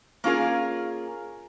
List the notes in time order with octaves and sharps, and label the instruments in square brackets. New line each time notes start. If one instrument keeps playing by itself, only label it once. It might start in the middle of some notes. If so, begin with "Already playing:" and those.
[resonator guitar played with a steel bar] A#3 C#4 F4 G#4 A#4